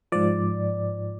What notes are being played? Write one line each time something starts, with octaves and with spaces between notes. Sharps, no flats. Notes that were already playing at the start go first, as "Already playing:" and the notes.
G#2 F3 D5